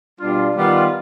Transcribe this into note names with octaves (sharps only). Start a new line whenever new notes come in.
B2 G3 D4 F4
D#3 G3 B3 F4